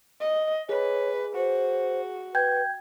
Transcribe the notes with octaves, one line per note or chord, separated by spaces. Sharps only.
D#5
G#4 B4 C#5
F#4 C5
B4 G5 G6 G#6